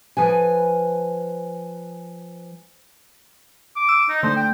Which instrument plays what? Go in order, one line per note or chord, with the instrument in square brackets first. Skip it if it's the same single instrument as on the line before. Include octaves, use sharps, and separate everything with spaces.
[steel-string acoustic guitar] F3 B4 G#5
[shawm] D6
[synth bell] E6
[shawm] D#4
[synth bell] D3 A3 [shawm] C5
[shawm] G5